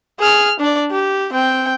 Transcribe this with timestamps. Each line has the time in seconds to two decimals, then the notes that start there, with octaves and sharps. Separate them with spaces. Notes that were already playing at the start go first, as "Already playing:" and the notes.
0.19 G#4 F6
0.60 D4 D5
0.91 G4
1.33 C4 G5